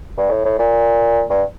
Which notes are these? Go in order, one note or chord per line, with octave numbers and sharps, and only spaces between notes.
G2
A2
A2
A#2
G2